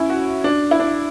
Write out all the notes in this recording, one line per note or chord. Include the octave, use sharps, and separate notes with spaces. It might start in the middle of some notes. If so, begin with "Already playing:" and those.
Already playing: C#4 E4
F#4
D4
E4
D4